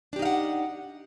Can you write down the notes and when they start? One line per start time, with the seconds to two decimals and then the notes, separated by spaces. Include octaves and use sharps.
0.13 D4
0.16 G4
0.19 D#4
0.22 F5
0.25 F#5